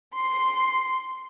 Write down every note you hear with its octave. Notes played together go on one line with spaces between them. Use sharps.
C6 C7